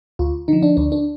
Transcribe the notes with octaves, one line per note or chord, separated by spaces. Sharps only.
D2 F4
D3 F3 D#4
D4
D2 D4
D4